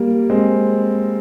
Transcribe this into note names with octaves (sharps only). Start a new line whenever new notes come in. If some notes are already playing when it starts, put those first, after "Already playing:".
Already playing: G3 A#3
G#3 C4